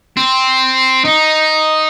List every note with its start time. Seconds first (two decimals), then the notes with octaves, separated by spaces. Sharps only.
0.17 C4
1.05 D#4